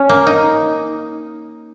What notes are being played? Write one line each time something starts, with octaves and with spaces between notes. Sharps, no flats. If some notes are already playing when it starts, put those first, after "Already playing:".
Already playing: C#4
A#3
D#4